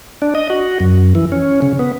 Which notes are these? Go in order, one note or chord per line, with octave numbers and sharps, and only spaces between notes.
D4
D#5
F#4
F#2
E3
C#4
C#3
B3